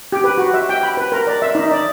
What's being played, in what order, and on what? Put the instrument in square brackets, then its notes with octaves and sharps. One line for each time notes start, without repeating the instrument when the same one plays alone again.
[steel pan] G4
B4
F#4
E5
G5
B5
B4
A#4
D5
E5
D#4
D5